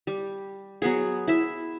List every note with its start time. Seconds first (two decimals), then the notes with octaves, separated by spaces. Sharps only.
0.07 G3
0.82 F#3 B3 G#4
1.28 E4 E5